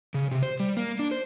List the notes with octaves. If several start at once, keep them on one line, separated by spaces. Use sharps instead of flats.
C#3
C3
C5
G3
A#3
D4
C5